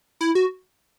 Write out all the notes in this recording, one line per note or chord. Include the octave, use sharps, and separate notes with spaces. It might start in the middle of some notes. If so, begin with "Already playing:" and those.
E4
F#4